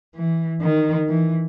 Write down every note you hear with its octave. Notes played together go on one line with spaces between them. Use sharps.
E3
D#3
E3